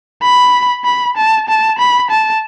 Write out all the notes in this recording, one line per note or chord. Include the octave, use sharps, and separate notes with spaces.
B5
B5
A5
A5
B5
A5